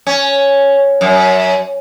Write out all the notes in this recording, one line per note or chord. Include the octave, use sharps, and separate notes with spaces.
C#4
F#2